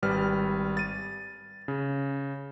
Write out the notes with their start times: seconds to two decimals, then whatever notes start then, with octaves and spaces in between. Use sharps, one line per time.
0.03 G#1 G3 B4 F6
0.77 A6 D#7
1.68 C#3